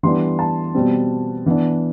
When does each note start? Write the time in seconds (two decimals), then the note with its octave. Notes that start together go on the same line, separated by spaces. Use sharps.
0.03 E3 G3 B3 D4 C6
0.39 A5
0.74 B2 G3 C4
1.46 E3 B3 D4